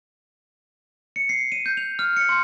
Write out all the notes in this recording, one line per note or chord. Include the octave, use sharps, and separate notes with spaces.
C#7
C7
D#7
G6
F7
F6
C#7
C6